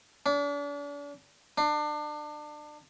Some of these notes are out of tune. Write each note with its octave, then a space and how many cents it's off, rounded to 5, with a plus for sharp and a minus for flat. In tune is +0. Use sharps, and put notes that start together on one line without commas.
D4 -40
D4 +30